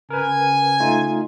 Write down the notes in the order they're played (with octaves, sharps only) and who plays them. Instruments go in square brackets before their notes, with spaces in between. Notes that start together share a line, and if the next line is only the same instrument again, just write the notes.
[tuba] C#3 [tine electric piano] A#4 B4 [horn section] G#5
[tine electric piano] A3 D#4 F4